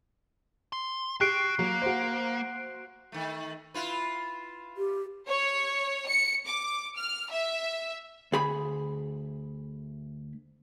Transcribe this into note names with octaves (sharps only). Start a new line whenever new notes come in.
C6
F#4 G4 F#6 C7 D7
F#3 A#3
F#4 C5
D#3 A3
E4 F4 B4
G4
C#5
C#7
D6
F6
E5
D2 G#4 B5